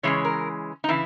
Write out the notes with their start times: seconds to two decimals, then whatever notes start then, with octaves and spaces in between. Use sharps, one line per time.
0.03 C#3 E3 G#3 C#4 C#5
0.25 A#4
0.84 D#4
0.89 C#3 E3 E4